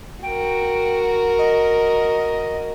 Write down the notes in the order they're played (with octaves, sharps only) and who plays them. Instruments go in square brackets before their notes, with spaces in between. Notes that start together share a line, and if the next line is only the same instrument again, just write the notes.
[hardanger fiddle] F#4 A#4 [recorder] G5
[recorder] D#5